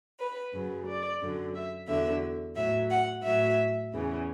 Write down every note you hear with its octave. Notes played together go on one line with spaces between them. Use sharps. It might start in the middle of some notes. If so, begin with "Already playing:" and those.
B4
F#2 C#3 F#3
D5
F#2 D3 F#3
E5
E2 D3 F#3 E5
A2 F#3 E5
F#5
A2 F#3 E5
E2 C#3 E3